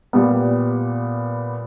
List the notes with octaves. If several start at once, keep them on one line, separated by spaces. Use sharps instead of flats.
A#2 G3 B3